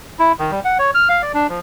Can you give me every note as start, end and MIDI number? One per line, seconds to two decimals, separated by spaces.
0.19 0.32 64
0.39 0.51 51
0.51 0.60 55
0.65 0.78 78
0.79 0.91 73
0.95 1.08 89
1.09 1.22 77
1.22 1.32 74
1.34 1.47 62
1.49 1.60 53